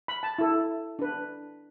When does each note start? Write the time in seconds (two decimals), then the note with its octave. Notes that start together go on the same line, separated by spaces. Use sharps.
0.08 B5
0.23 A5
0.38 E4 A4
0.99 D4 B4